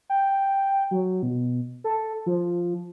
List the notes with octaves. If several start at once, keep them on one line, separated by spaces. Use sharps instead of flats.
G5
F#3
B2
A4
F3